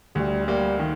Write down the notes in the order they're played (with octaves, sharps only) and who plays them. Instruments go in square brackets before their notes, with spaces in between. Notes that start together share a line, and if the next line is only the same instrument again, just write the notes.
[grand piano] D2 [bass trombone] G3
[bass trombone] G3 [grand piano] A#3
[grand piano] D#3